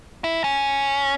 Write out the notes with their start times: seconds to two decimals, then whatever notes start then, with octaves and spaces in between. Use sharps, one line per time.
0.24 E4
0.44 C#4